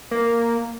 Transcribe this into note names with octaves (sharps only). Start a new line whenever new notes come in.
A#3